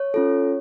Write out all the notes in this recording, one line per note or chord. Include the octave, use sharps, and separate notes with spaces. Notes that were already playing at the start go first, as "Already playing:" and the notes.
Already playing: C#5
C#4 F4 A4